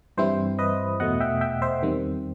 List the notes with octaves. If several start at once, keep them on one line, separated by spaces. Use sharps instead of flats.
G2 E3 G3 C4 E4 C5
B4 D#5
E2 B2 A3 D#5 F#5
E5 G5
E5 G5
C5 E5
E2 D#3 G3 C4